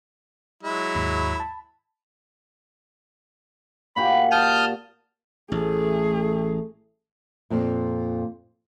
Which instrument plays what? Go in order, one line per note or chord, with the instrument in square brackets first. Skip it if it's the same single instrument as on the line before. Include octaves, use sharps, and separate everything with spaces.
[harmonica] F#3 G#3 E4
[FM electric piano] D#2 G#2 B5
A5 B5
[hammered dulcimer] A#2 F#4 G4 [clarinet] B5
[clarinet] A5 [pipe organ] D#6 F6 G6
[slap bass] A1 [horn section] A3 [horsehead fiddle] G#4
[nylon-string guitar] F2 A#2